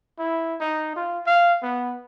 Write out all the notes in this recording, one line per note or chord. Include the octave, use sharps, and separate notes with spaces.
E4
D#4
F4
F5
B3